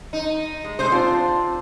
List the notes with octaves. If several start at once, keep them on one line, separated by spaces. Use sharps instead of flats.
D#4
G#3
G#3 A3 D#4 C5
C4 D4 F4